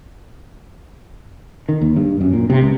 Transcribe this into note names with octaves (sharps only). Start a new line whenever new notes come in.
D#3
D#2
G2
F#2
A#2
C3
C#2